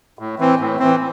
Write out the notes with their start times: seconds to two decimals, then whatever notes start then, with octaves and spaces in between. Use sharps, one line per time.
0.19 A2
0.39 E3 C4
0.60 A2
0.79 E3 C4